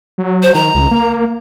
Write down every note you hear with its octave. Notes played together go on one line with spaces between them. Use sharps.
F#3
C5
D#3 A#5
C#2
A#3